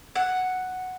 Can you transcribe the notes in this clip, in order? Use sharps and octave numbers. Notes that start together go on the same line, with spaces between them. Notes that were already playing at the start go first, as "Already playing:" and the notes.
F#5